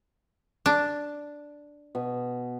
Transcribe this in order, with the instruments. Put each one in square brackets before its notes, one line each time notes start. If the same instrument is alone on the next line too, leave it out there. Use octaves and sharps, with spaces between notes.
[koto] D4
[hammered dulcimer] B2